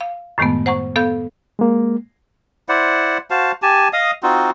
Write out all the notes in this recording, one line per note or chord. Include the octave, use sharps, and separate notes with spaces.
F5
F#2 A2 D#3 G#3 A3 B3
C5 F#5 A#5 C#6
B3 A4 F5 G6
G#3 A#3
E4 C5 D5 F#5
F#4 C5 F5 A5
G4 G#5 A5
D#5 F5 D#6
C4 D#4 F4 F#4